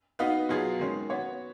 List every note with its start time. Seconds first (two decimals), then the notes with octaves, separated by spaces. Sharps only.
0.19 B3 D#4 F#4 B4 F5
0.49 B2 F#3 B3 F4 G#4
0.79 D#3 G#3 C#4
1.10 B3 F#4 C#5